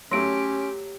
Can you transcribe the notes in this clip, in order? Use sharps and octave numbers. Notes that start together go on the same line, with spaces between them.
F#3 A3 C#4 G4 C6 D7